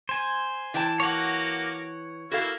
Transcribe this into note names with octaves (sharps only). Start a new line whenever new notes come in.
C5 G#5
E3 D5 G5 A5
A#3 F#4 C#5 F#5 D6
A#3 E4 F#4 A4 F5